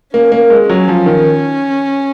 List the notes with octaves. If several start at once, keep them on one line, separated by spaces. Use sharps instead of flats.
A#3 C#4
A#3
G#3
F#3 C#4
F3
D#3